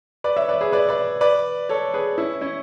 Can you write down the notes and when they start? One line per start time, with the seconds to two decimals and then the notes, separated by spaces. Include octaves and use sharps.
0.24 B4 D5
0.36 C#5 E5
0.48 B4 D5
0.61 G#4 B4
0.72 B4 D5
0.89 B4 D5
1.21 B4 D5
1.69 A4 C#5
1.94 G#4 B4
2.18 C#4 E4
2.41 C#4 E4